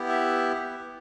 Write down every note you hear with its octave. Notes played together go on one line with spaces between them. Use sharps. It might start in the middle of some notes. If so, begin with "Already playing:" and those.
Already playing: B3 E4 G4
E5